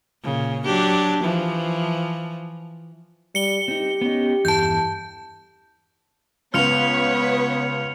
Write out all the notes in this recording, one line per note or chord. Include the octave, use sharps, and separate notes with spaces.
A#2 C#3
F#3 D4 G4
E3 F3
G3 C#7 G7
C4 D#4 G4
B3 C#4 D#4
E2 G2 A4 A5 G6
C#2 B3 B4 C#5 F6 C#7 F7